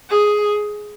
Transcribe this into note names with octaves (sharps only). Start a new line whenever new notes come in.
G#4